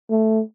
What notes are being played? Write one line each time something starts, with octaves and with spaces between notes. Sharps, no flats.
A3